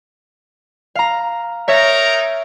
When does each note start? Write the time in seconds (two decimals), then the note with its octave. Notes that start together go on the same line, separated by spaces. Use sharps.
0.95 F5 A#5
1.68 D#4 A#4 C#5 E5 A#5